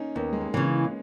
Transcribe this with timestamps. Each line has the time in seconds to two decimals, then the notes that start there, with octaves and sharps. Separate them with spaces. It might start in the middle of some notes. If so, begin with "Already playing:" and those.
Already playing: A#3 C#4 D#4
0.15 D#2 B3
0.33 G#3
0.41 A#3
0.54 C#3 E3
0.66 C#4